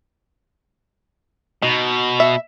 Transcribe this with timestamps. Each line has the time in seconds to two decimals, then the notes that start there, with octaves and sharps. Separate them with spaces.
1.62 B2 D#4
2.20 E5